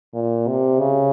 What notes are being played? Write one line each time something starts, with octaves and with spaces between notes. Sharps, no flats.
A#2
C3
C#3